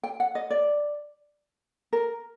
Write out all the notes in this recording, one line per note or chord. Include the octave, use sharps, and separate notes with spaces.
G5
F#5
D#5
D5
A#4